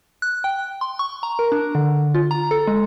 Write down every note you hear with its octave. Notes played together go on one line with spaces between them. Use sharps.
F#6
G5
C6
C#6
A#5
A#4
D4
D3
F4
A#5
A4
G#3